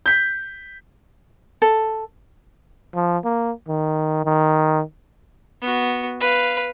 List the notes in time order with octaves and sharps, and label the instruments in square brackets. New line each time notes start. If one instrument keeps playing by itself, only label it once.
[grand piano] G6 B6
[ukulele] A4
[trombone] F3
A#3
D#3
D#3
[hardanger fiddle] B3 F#4
B4 F5